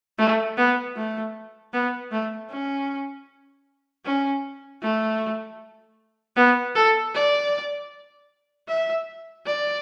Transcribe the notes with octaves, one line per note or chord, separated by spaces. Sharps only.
A3
B3
A3
B3
A3
C#4
C#4
A3
B3
A4
D5
E5
D5